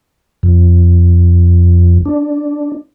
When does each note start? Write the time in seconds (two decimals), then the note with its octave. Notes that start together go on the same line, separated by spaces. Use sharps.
0.43 F2
2.05 D4